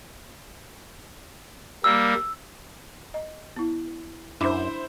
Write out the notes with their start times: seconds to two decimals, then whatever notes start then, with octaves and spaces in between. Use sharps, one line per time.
1.84 G3 A#3 E6
3.14 D#5
3.56 B3 E4
4.41 F#2 D4 E4 C5 D6